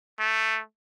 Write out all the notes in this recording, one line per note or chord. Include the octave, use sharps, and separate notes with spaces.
A3